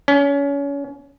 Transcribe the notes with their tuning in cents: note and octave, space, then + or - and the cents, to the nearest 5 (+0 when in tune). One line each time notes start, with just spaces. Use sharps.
C#4 +30